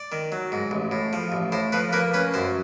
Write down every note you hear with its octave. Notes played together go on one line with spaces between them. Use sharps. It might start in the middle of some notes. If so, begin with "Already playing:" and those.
Already playing: D5
D#3
F#3
G#2
A1
A2
F3
A1
A2 C5
F3 B4
A#3 B4
C#4 B4
F#2 C5